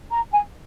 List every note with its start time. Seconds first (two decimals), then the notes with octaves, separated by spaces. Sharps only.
0.12 A#5
0.33 G#5